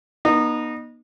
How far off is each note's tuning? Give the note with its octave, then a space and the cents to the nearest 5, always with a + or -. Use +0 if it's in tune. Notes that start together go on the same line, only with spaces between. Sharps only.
B3 -40 D#4 -20